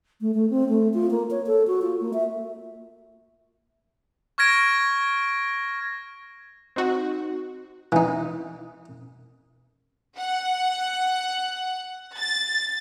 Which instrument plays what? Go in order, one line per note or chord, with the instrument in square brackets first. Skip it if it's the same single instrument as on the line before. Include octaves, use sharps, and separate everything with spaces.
[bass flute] A3
A3
C4
A3
F4
A#3
C#5
A4
F#4
F4
A#3
E5
[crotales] C#6 F6 G#6 A#6 D7
[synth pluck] C4 D#4 F#4
[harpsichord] E3 D#4
[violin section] F#5
A6